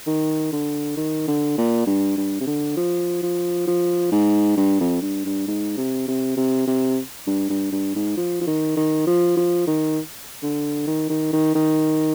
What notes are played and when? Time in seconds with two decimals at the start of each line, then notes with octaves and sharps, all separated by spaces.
0.07 D#3
0.53 D3
0.97 D#3
1.28 D3
1.58 A#2
1.86 G2
2.17 G2
2.41 C3
2.47 D3
2.77 F3
3.23 F3
3.67 F3
4.12 G#2
4.57 G2
4.80 F2
5.02 G2
5.25 G2
5.48 G#2
5.77 C3
6.08 C3
6.37 C3
6.67 C3
7.27 G2
7.49 G2
7.72 G2
7.95 G#2
8.17 F3
8.41 F3
8.47 D#3
8.77 D#3
9.07 F3
9.37 F3
9.67 D#3
10.43 D3
10.87 D#3
11.09 D#3
11.33 D#3
11.55 D#3